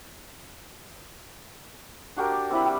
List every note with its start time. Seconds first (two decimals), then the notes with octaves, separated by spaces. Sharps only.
2.17 D4 F#4 G4 A#4
2.32 D6
2.50 C4 E4 B5
2.66 G3